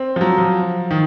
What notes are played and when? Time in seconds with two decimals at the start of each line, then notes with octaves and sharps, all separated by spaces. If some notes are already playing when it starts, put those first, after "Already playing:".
Already playing: C4
0.16 F3
0.21 F#3
0.38 F3
0.91 D#3